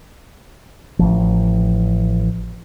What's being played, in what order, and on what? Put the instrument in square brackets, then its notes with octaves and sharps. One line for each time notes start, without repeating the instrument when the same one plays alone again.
[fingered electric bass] A1 F3